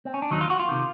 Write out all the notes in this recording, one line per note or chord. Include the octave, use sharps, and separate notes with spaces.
C4
C#4
D4
D#2 D#3 F#3 D#4
F4
F#4
F4
C3 D#3